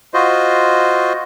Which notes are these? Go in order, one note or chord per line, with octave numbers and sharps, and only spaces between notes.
F4 F#4 C5 D#5